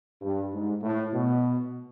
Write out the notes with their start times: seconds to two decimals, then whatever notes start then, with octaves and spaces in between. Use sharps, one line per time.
0.22 G2
0.52 G#2
0.82 A2
1.13 B2